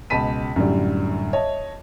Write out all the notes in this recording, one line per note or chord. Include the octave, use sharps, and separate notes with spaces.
C#2 B2 A5 B5 B6 D#7
F#2 A2 D3 G3
C#5 D#5 E5 A5